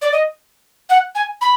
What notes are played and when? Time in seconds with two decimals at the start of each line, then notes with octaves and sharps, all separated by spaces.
0.02 D5
0.12 D#5
0.89 F#5
1.15 G#5
1.41 B5